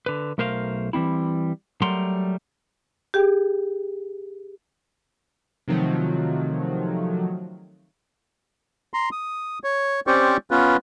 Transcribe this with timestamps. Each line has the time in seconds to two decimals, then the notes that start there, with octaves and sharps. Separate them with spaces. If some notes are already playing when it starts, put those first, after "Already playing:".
0.06 D3 B4
0.38 B1 A3 A#4 C5 D5 F5
0.93 E3 G3 C4 E4
1.82 F#3 G3 A3 A#4 F#5 C6
3.14 G4 G#4 G5
5.68 C3 D#3 F3 F#3 A3
8.94 A#5 C6
9.12 D#6
9.64 C#5
10.07 C4 C#4 G4 C5 D5 C#6
10.51 B3 C#4 F4 B4